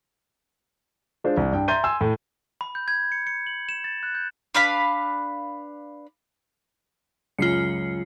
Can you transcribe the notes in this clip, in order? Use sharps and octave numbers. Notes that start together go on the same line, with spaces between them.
G#3 D4 F4 C5
C2
G2 G5
E5 A#5 C6 G6 A6 D#7
G#5 C6 E6
A2
B5
G6
G#6
C#7
C#7
F#7
E7
A6
F#6
G6
D4 B4 F5 B5
C#2 F#2 C#3 F4 C7 C#7